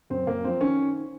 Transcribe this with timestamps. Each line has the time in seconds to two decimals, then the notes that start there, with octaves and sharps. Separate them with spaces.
0.10 F#2 C4
0.27 F#2 A#3
0.44 F3 C4
0.61 D#3 C#4